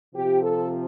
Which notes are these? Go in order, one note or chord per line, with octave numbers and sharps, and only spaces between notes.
C3 F3 G4
A4